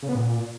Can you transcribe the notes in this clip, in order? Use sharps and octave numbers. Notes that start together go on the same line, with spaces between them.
C#3
B3
A#2